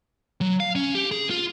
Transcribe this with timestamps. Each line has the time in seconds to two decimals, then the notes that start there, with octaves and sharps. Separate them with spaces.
0.41 F#3
0.60 F5
0.75 C#4
0.95 G4
1.11 G#4
1.30 F4